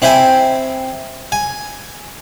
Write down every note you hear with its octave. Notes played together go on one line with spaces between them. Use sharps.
C4 E4 E5 G5 G#5
G#5